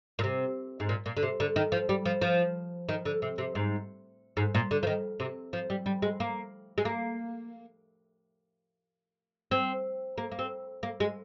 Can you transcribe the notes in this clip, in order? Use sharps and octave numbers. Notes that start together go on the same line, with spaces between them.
A#2
C3
G#2
A#2
A#2
D3
C3
D3
D#3
F3
G3
F3
F3
D#3
D3
C3
C3
G#2
G#2
A#2
D3
F3
D#3
C3
F3
G3
G3
G#3
A#3
G#3
A#3
C4
A#3
A#3
C4
A#3
G#3